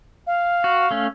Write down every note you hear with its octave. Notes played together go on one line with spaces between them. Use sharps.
F5
F#4
A3 C#4